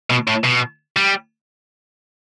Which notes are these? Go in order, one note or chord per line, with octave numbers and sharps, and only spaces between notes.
B2
A2
B2
G3